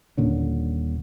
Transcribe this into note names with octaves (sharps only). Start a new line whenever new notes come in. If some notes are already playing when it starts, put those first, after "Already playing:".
D#1 A#2 D3 C#4